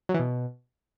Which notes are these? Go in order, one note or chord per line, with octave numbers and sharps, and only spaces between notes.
F#3
E3
B2